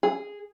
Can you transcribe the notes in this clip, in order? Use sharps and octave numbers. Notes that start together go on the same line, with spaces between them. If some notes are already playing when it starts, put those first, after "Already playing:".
G#4